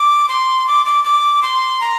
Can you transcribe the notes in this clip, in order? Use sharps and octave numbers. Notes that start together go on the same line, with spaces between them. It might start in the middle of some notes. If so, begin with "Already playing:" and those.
Already playing: D6
C6
D6
D6
D6
C6
A#5